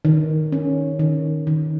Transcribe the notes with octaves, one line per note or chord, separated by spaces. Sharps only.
D#3
C#4
D#3
D#3